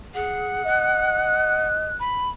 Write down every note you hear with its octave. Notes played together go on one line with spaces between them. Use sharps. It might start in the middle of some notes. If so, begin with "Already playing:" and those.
G#4 F#5
D#5 F#6
B5